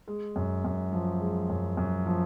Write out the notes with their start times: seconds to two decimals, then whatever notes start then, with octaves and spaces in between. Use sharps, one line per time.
0.08 G#3
0.36 F#2
0.65 F#2
0.93 F3
1.21 G#3
1.50 F#2
1.77 F#2
2.06 F3